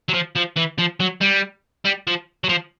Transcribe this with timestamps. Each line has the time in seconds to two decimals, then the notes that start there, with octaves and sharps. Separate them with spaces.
0.09 F#3
0.13 F3
0.36 F3
0.56 E3
0.78 F3
1.00 F#3
1.21 G3
1.85 G3
2.07 F3
2.44 F#3
2.49 F3